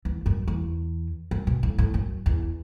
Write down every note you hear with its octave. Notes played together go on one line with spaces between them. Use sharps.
E2
F#2
E2
F#2
B2
A2
A2
F#2
E2